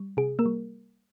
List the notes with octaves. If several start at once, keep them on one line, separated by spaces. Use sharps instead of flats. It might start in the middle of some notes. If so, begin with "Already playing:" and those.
Already playing: G3
C3 G#4
A#3 A#4
G3